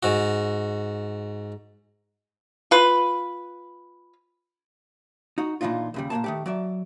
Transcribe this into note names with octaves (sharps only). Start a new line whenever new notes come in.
G#2 F#4
F4 B4
D#4 F#4
A#2 E3 D4 D#4 F4
D#2 C#3 G3
A#2 A3 A#3 A5
D#3 A3 G4
F#3 D5 E5